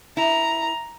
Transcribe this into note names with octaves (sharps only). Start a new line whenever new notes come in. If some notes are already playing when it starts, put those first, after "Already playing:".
E4 A#5